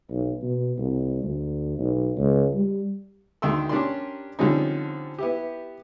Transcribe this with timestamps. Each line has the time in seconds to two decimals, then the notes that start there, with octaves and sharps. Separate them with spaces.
0.10 B1
0.43 B2
0.78 C2
1.23 D2
1.79 B1
2.17 C#2
2.54 G3
3.42 D2 D3 D#3 G5 C6 E6
3.69 C#4 D4 G4 A#4 D5 C6
4.39 D3 F3 G3 C4 C#4 D#4
5.19 B3 E4 G4